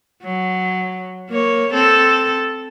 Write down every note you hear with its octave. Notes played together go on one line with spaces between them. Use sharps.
F#3
A#3 C#5
C4 A4